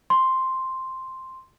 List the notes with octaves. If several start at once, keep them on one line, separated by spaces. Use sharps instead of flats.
C6